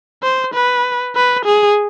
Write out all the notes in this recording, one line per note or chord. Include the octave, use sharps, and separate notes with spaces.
C5
B4
B4
G#4